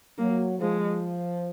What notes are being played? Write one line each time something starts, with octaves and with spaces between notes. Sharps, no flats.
F#3 A#3
F3 G#3